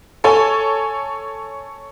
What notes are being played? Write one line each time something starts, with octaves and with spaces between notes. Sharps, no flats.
A4 C#5 G#5